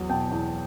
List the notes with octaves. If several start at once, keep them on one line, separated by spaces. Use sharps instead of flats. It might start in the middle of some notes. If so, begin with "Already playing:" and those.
Already playing: E2 F#3
B2 G5 A5
E2